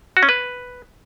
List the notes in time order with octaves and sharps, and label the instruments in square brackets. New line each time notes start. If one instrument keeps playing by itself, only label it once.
[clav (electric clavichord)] F#4
C#4
B4